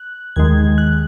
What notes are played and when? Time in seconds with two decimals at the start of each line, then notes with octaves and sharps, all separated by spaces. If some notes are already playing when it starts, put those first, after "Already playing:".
Already playing: F#6
0.36 D#2 D#3 G#3 G#6
0.78 F#6